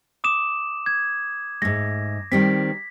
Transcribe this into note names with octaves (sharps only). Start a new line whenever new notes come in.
D6 D#6 E7
G#6
G#2 A3 A#6
D#3 G3 C4 B6